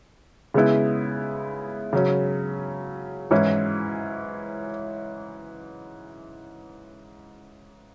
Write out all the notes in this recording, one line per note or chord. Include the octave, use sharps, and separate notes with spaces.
C#3 G#3 B3 E4
C#3 F#3 C#4
G#2 E3 C#4 E4